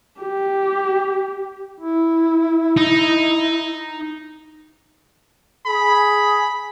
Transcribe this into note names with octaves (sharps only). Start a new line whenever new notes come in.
G4
E4
D#4
G#4 B5